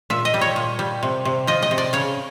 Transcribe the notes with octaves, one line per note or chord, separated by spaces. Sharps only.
A#2 E5
D#5
G3
C#5
A#2
G3
C3
C3
F3 D#5
D#5
C3
D5
C#3 C#5